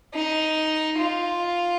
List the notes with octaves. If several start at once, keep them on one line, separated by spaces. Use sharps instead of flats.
D#4
F4